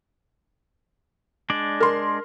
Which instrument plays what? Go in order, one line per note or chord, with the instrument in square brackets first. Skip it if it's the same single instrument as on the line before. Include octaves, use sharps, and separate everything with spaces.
[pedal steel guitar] G#3 D4 D5
[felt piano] A#4 C6